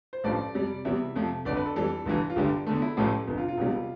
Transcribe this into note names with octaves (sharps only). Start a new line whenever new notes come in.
C5
A1 G2 F3 A3 D5
F2 C3 G3
E2 C3 E3 G3 E5
F2 C3 F3 A3
G1 F2 D3 D5
B4
A4
F2 E3 G3 A4
G1 G2 E3
F4
G1 G2 D3 G4
E2 D3 A3
E4
A1 A2 F3 A3 G4
G1 F2 C3
F4
F4
E1 E2 C3 G3